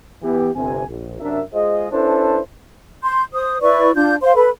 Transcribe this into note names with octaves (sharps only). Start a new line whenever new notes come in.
E3 B3 G4
G1 C3 G#5
A#1
F#2 C3 D4 A#4 E5
G#3 F4 G#4 C5 D#5
C#4 D4 E4 A4 B4 C5
C6 G6
C5 D#6
E4 B4 D5 C#6
D4 F4 G6
C5 F5 C6
A4 B4 B5